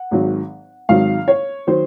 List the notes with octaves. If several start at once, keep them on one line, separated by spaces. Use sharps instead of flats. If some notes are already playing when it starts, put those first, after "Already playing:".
Already playing: F#5
G#1 G#2 D#3 F#3
G#1 G#2 D#3 F#3 F5
C#5
D#3 F#3 C5